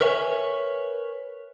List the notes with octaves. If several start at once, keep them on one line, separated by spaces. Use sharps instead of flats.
A#4 B4 C#5 E5 G5 G#5